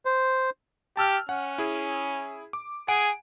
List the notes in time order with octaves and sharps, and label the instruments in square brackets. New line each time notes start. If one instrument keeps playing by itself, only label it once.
[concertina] C5
[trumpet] G4 [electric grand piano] A5 E6 F6
[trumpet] C#4 [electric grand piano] F#5
[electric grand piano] E4 G#4
D6
[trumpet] G#4 [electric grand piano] F#5 G#5 D7